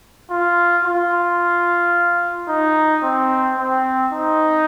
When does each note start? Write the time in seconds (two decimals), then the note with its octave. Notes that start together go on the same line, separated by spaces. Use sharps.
0.30 F4
0.85 F4
2.48 D#4
3.03 C4
3.58 C4
4.13 D#4